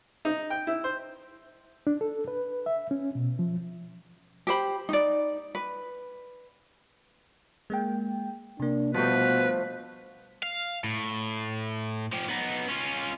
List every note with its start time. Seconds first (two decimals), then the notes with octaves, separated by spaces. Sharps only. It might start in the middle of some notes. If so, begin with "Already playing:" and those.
0.25 D#4
0.50 G5
0.67 E4
0.84 C5
1.87 D4
2.01 A4
2.28 B4
2.66 E5
2.91 C#4
3.15 B2
3.39 F3
4.47 G4 C5 B5
4.89 D#4 D5
5.55 B4
7.70 G#3 A#3 G5
8.60 C3 A#3 D4
8.94 B2 F3 G3 A3 B4
10.43 F5
10.84 A2
12.12 F3 G4
12.29 B3 D#4
12.68 C#4 F4